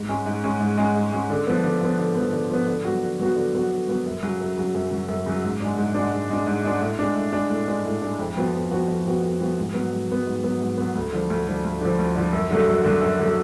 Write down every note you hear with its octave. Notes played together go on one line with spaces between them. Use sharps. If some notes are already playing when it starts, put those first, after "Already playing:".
Already playing: G#2
G#3 C#4
G#2
G#3 C#4
G#2
G#3 C#4
G#2
G#3 C#4
D3
F3 B3
D3
F3 B3
D3
F3 B3
D3
F3 B3
D3
F#3 B3 F#4
D3
F#3 B3 F#4
D3
F#3 B3 F#4
D3
F#3 B3 F#4
F#2
C#3 F#3
F#2
C#3 F#3
F#2
C#3 F#3
F#2
C#3 F#3
G#2
G#3 D4
G#2
G#3 D4
G#2
G#3 D4
G#2
G#3 D4
A2
G#3 D4
A2
G#3 D4
A2
G#3 D4
A2
G#3 D4
F2
F3 B3 F#4
F2
F3 B3 F#4
F2
F3 B3 F#4
F2
F3 B3 F#4
G#2
F#3 B3
G#2
F#3 B3
G#2
F#3 B3
G#2
F#3 B3
D2
D3 F3
D2
D3 F3
D2
D3 F3
D2
D3 F3
F#2
D3 F#3 A3
F#2
D3 F#3 A3
F#2
D3 F#3 A3